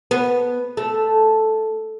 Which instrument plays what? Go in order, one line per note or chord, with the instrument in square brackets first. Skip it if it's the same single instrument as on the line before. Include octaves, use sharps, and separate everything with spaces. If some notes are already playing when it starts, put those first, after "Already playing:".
[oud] B3
A3